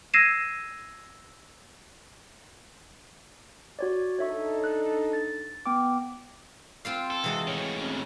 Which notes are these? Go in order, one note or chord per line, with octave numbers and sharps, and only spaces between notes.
E6 G#6 A#6 C7 D#7 E7
F#4 C#5 D5
D4 D#4 A4 C#5 E5 C#6
F#6
A6
B3 G5 D6
C4 F4 F5
A4
C3 E3 G#3 F#4
A2 D#3 C#5
C3 C#4